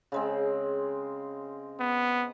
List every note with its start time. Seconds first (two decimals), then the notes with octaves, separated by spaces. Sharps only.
0.12 C#3 G#3 C4
1.80 B3